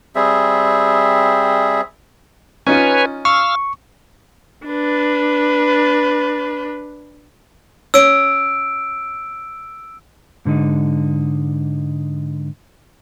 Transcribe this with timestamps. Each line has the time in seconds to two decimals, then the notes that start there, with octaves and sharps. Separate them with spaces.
0.16 G3 C4 G#4 E5
2.67 C#4 D#4 F4 B4 C#5 G#5
3.25 F5 C#6 E6 F6
4.66 D4 B4
7.94 C#4 E6 D7
10.45 G#2 D3 G#3 D#4